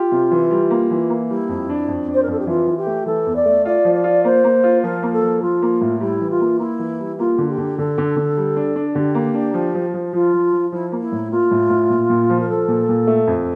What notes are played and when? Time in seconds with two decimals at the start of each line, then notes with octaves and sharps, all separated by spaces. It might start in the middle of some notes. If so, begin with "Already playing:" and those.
Already playing: F4 G4
0.12 C3
0.31 E3
0.51 G3
0.70 A#3
0.91 E3
1.10 A#3
1.30 G3 E4
1.49 F2
1.70 D4
1.88 F2
2.08 D4
2.14 C5
2.22 A#4
2.28 F2 A4
2.39 G4
2.47 E3 F4
2.67 E3
2.77 G4
2.86 A3
3.06 E3 A4
3.26 E2
3.35 D5
3.46 A3
3.65 F4 D5
3.85 F3
3.94 D5
4.04 F4
4.24 A#3 C5
4.44 A#3
4.63 F4
4.82 F3 A#4
5.03 A#3
5.12 A4
5.22 F3
5.42 F3 F4
5.62 A#3
5.81 A2
6.01 G3 E4
6.20 E3
6.30 F4
6.40 A#3
6.59 A#3 E4
6.79 E3
7.00 G3
7.18 A#3 F4
7.38 D3
7.49 G4
7.58 D3
7.77 D3 A4
7.98 D3
8.16 D3
8.37 G3
8.56 D4
8.76 D4
8.95 D3 G4
9.15 A#3
9.34 D4
9.54 F3
9.75 F3
9.94 F3
10.13 F3 F4
10.33 F3
10.53 F3
10.72 F3 E4
10.92 A#3
10.99 E4
11.12 A2
11.31 A#3 F4
11.51 A2
11.70 A2
11.90 A#2
12.10 A#2
12.30 F3
12.40 A#4
12.49 F3 A4
12.68 A#2
12.89 A#2
13.07 A3
13.27 F2